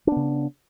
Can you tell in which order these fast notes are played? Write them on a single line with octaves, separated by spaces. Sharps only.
D4 B3 C#3